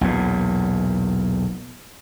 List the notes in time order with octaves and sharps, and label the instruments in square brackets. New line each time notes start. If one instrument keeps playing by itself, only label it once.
[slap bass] B1 E2 A#2